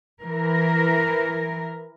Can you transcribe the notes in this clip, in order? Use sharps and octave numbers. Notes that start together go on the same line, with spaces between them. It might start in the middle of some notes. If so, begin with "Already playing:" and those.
E3 A#4